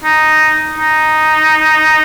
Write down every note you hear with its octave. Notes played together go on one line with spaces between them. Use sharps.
D#4
D#4